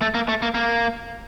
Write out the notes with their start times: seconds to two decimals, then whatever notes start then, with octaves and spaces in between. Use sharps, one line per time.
0.02 A3
0.14 A#3
0.28 A3
0.42 A#3
0.54 A#3